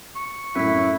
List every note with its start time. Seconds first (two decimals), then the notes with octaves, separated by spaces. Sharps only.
0.16 C#6
0.55 F#2 A2 C#4 E4 B6